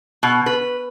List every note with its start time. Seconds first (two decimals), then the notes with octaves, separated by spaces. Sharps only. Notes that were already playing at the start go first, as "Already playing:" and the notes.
0.23 B2
0.46 B4